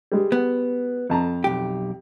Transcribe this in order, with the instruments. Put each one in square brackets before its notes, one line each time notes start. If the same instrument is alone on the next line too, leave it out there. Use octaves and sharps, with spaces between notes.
[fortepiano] G3 G#3
[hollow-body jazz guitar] B3
[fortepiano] F2 A5 A#5
[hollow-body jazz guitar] B1 G4